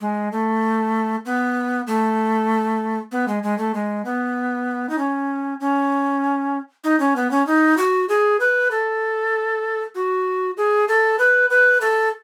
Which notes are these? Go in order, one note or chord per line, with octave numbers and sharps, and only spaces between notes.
G#3
A3
B3
A3
B3
G#3
G#3
A3
G#3
B3
D#4
C#4
C#4
D#4
C#4
B3
C#4
D#4
F#4
G#4
B4
A4
F#4
G#4
A4
B4
B4
A4